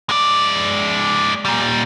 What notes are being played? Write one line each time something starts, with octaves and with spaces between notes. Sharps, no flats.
G#3 D5
A#2 G3